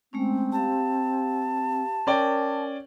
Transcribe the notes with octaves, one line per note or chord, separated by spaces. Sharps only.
G#3 A3 C4 C#4
G4 F5 A5
C#4 A#4 D5 G5